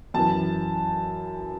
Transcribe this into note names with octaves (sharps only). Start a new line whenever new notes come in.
F#2 E3 A5